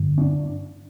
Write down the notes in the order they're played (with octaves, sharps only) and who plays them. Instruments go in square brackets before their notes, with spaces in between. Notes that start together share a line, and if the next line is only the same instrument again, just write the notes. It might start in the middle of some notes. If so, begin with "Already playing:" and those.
Already playing: [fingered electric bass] G2 D3
C#4
D4